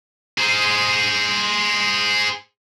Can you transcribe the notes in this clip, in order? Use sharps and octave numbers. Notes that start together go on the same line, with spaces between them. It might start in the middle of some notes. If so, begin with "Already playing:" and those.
G#4 C5